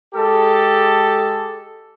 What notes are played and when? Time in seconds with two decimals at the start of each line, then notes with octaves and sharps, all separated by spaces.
0.15 G#3 G4 A4